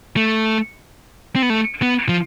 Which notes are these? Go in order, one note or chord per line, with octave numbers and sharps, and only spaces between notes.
A3
C4
B3
A3
B3
F3